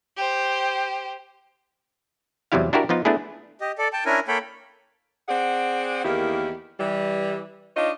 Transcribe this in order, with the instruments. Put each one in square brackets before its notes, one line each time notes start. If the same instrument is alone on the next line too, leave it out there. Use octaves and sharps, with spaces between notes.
[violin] G4 C5
[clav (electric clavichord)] E2 C3 F#3 G3 E4 F5
D4 E4 F#4 G4 A#4
F3 B3 D#4 F4
A3 B3 D4 E4 G#4
[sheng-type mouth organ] G4 D#5
A4 D5
G5 A5
C#4 D4 E4 A#4 G#5
A#3 A4 C#5 G5 B5
[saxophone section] C4 G#4 D5 F#5
E2 D#3 A#3 E4 G4
E3 G3
D4 D#4 F4 C#5 D#5